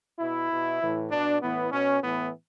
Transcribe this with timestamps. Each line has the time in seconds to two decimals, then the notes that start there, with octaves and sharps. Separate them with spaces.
0.18 B2 E4
0.49 B2
0.79 E3
0.84 A2
1.10 B2 D4
1.40 A2 E3 B3
1.70 B2 C#4
2.01 A2 E3 B3